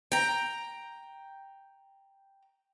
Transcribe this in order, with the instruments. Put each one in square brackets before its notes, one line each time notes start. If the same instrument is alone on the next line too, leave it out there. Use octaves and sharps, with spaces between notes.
[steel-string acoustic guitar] G5 A#5